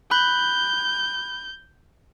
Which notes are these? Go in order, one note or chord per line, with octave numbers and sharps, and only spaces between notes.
B5 F#6 G6